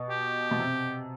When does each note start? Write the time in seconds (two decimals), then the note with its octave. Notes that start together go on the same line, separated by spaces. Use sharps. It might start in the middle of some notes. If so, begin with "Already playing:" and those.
Already playing: B2
0.10 G4
0.51 B2
0.59 C3